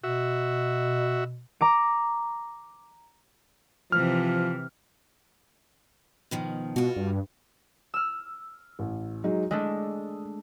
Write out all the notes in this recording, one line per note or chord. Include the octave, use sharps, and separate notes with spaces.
B2 F#4 E5
A#5 D6 D7
C3 E3 F3 F6
B2 D#3 F3
B2 F4 F#4
G2
E6 F6
A1
F#3 G#3 D#4
G#3 A3 D4 D#5